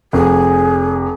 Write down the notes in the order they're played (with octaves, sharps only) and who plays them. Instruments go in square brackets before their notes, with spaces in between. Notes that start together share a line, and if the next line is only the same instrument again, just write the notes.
[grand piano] F1 [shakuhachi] G#4